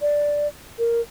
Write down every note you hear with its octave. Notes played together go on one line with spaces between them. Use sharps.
D5
A#4